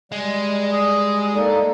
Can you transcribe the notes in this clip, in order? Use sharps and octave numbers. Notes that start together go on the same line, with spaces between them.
G3 G#3 D#5
D#6
A#3 D#4 A4 D5